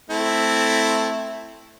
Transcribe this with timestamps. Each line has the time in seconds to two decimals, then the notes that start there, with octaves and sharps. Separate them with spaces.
0.10 A3 C4 E4